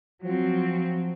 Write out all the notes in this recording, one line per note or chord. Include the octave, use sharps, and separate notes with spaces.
F3 F#3 C4